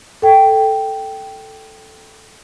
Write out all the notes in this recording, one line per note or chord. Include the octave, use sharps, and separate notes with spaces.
A4 G5